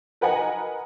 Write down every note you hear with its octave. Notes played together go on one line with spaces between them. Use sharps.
A#4 B4 D#5 F#5 G#5 A#5